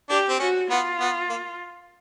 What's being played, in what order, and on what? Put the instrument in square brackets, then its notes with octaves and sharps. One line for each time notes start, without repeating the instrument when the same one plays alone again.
[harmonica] D4 [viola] G4
[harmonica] C4
[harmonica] C#4 [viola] F#4
[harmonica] B3 [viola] F4
[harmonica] B3
A#3